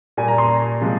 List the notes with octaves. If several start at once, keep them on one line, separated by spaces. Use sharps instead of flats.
A#2 G3 G#5
A#5
C6
C3 F3 G#3